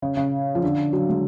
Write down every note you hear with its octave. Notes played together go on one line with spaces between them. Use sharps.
C#3
C#3
F3
D3
F#3
G#3